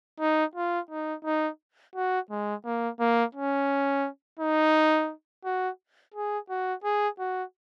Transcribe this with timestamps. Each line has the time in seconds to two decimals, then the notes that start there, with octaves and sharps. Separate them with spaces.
0.20 D#4
0.55 F4
0.91 D#4
1.25 D#4
1.95 F#4
2.30 G#3
2.65 A#3
3.00 A#3
3.35 C#4
4.39 D#4
5.45 F#4
6.14 G#4
6.50 F#4
6.84 G#4
7.19 F#4